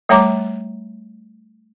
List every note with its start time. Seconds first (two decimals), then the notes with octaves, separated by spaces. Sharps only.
0.09 G3 A3 C#5 E5 A#5 D6